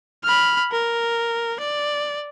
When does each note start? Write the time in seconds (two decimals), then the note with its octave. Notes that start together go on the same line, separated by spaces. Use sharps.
0.23 B5 F6
0.72 A#4
1.60 D5